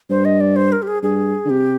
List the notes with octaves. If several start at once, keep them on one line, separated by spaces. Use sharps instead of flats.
G2 C5
D#5
D5
C5
A#4
G4
G#4
G2 G#4
D3
C3 G4